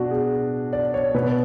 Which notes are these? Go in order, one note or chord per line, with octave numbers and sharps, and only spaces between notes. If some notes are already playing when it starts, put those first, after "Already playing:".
Already playing: B2 D4 F#4
G#4
D5
C#5
B2 B4